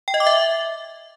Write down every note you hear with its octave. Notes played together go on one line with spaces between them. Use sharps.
G5
D#5
D6
E5